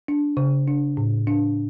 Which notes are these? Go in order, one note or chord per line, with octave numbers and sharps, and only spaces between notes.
D4
C#3
D4
A2
D4